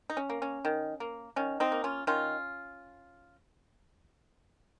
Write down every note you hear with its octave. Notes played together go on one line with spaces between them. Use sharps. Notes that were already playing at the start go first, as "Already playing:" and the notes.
D#4
C#4
A#3
C#4
D#3
A#3
D#3 C#4
C4 D#4
A#3
C#4 F4
D#3 C#4 F4